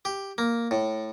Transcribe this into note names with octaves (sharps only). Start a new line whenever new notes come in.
G4
A#3
A2